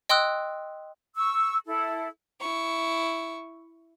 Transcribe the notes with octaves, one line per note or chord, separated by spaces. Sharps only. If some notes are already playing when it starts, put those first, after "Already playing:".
D#5 G5 C6 D#6 E6 F#6
C#6 E6
E4 A4
E4 C#6